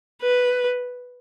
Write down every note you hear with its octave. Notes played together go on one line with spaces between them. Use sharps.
B4